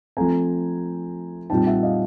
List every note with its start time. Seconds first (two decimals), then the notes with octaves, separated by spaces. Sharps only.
0.17 F3 A3 C4 G#5 A#5
1.50 A#2 G3 C4 D#4 G5 A5
1.67 E5 F#5
1.83 D#5 F5